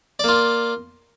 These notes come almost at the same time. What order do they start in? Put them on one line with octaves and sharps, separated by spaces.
D5 A#3 F4